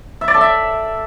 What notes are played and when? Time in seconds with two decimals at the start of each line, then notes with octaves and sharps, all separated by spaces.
0.21 E5
0.28 D5
0.34 A4
0.41 E5